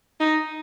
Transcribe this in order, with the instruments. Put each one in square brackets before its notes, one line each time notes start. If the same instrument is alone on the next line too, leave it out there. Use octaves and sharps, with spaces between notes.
[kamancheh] D#4